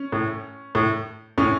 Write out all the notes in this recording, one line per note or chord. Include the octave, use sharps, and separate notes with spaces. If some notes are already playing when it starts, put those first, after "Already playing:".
Already playing: C#4
A2
A2
A2 C#4